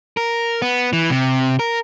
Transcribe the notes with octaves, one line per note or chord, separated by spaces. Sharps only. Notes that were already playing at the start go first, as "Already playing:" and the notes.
A#4
B3
E3
C3
A#4